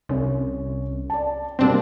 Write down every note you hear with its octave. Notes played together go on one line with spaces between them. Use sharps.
C2 C#4
D5 A5
B2 G3 A#3 C4 D4